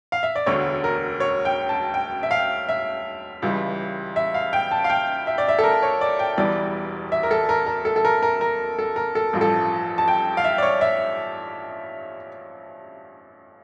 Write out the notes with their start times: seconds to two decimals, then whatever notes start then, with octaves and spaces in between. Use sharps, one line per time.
0.12 F5
0.23 E5
0.35 D5
0.46 E1 D2 D3 C#5
0.84 A#4
1.20 C#5
1.45 G5
1.69 A5
1.94 G5
2.23 E5
2.31 F5
2.69 E5
3.42 C#2 C#3 E3 G3
4.16 E5
4.34 F5
4.53 G5
4.71 A5
4.84 F5
4.90 G5
5.27 E5
5.38 D5
5.49 E5
5.59 A4
5.64 A#4
5.83 C#5
6.01 D5
6.19 G5
6.38 E1 E2 E3 G3 D5
7.12 E5
7.23 A#4
7.31 A4
7.49 A#4
7.66 A#4
7.85 A4
7.96 A4
8.05 A#4
8.23 A#4
8.41 A#4
8.79 A4
8.96 A#4
9.15 A4
9.33 A1 G2 F3
9.41 A4
9.98 A5
10.08 G5
10.37 F5
10.44 E5
10.58 D5
10.62 C#5
10.81 E5